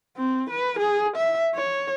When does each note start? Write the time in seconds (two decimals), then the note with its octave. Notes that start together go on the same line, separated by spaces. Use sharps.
0.17 C4
0.49 B4
0.78 G#4
1.16 E5
1.55 C#5